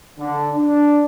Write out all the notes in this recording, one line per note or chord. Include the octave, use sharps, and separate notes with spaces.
D3
D4